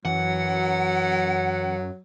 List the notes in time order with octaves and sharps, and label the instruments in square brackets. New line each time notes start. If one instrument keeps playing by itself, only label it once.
[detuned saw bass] F#2 [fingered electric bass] E3 [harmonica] F#3 [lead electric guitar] F#5